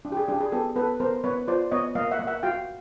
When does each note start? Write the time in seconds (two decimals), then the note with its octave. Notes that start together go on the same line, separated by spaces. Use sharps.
0.05 D4
0.12 G4
0.17 G#4
0.28 D4 G4
0.41 G#4
0.52 B3 G4 A4
0.76 B3 A4 B4
1.00 B3 A#4 C5
1.24 B3 B4 C#5
1.48 F4 C5 D5
1.72 B3 C#5 D#5
1.95 A#3 D#5 F5
2.11 E5 F#5
2.19 A#3
2.27 E5 F#5
2.43 F#4 F5 G5